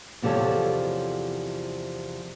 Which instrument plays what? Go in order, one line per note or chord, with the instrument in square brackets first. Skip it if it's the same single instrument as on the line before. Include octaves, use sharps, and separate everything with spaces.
[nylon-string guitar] E2 C3 F3 G3 A4 C#5